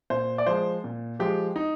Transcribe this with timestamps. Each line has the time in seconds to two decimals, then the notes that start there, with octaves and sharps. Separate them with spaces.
0.10 A#2 C5
0.38 D5
0.46 F3 G#3 C5
0.84 A#2
1.19 F3 G#3 G4
1.56 D#4